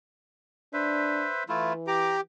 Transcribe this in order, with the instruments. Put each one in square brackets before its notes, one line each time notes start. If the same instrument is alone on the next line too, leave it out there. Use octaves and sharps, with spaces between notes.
[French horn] D4 [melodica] B4 C5 E5
[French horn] E3 [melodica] A3 E4 F4
[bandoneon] G4 [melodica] A#5 D6